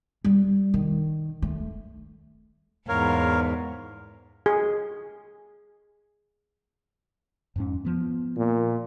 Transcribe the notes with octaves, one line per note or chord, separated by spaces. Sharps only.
G3
D#3
A3
E2 G#2 A#4 C#5 F5
G#4
F2 G#2 C#4
F3 B3
A#2